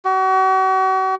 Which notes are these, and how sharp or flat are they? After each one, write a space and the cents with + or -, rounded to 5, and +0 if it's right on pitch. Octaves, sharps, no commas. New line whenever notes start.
F#4 +40